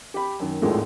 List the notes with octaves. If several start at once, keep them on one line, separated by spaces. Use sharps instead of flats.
G4 B5
F#2 D#3
G#1 D#2 A2 F3 G#3 A4